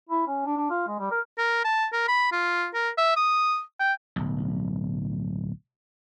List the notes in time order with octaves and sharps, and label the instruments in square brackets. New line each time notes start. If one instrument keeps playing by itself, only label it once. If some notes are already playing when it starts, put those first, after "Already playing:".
[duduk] E4
C#4
D4
D4
F4
G#3
G3
A#4
[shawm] A#4
A5
A#4
B5
F4
A#4
E5
D#6
G5
[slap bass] D1 B1